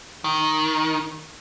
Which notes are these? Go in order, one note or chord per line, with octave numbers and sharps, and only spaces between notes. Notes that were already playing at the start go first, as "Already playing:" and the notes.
D#3